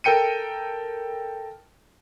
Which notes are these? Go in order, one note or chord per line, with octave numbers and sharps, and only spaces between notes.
A4 A#4 G5 C#7 D#7